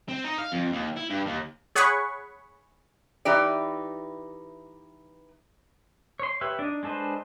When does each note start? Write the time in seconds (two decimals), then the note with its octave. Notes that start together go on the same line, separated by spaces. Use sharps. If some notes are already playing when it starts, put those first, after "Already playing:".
0.09 C4
0.24 D#4
0.38 F5
0.52 F2
0.72 D#2
0.97 E4
1.10 G2
1.26 D#2
1.75 G#4 C#5 F#5 G#5 B5 C#6
3.25 E3 D#4 G4 D5
6.20 C#5 C6
6.41 G4 B4 C#5 E5
6.59 D4 D#4
6.83 G#3 D4 A4 B4 C5